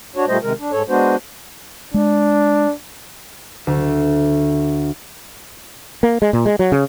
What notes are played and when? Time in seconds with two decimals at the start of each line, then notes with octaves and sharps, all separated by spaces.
0.16 D4 F#4 C#5
0.28 A#2 G3 A3 C5 D#5
0.43 C3 D#3 G#3 A#4
0.59 D4
0.72 G#2 A4 C#5
0.89 G#3 B3 D4 F#4 C5
1.94 G#3 D4
3.67 D2
6.03 A#3
6.22 G#3
6.33 A#2
6.46 G#3
6.59 F#3
6.72 C#3